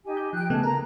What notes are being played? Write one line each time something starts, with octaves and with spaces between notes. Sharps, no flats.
D#4 G4 G#5
G6
F3 G5 G#5 F#6 G6
C#3 A3 B3 G#4 D#5 A5
A#4 A#5